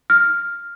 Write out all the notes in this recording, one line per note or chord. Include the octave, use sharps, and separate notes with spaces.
F6